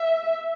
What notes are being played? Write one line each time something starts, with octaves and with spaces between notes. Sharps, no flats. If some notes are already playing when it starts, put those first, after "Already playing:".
Already playing: E5